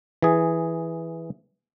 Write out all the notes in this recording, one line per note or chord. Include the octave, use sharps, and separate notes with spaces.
E3 G#4